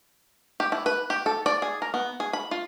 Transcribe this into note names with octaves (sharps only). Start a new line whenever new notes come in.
G4
E4
B4
G4
A4
D5
G#4
A#4
B3
G#4
B5
F4